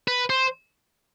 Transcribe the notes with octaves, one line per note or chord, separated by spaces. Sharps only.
B4
C5